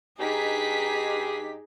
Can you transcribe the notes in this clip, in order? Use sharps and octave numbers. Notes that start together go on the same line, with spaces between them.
G2 D#4 G4 G#4 B6